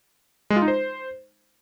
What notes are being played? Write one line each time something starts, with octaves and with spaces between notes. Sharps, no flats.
G#3
F4
D#4
C5